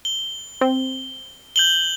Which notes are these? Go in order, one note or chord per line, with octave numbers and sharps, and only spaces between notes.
G7
C4
G6 F#7 G7